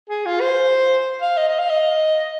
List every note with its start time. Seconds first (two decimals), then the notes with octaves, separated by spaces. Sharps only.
0.09 G#4
0.26 F4
0.41 C5
1.22 F5
1.37 D#5
1.48 D#5
1.59 F5
1.70 D#5